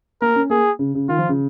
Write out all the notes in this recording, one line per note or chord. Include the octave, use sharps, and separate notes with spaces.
A#3 A#4
C#4
A#3 G#4
C#3
C#3
D#3 F4
F3
C#3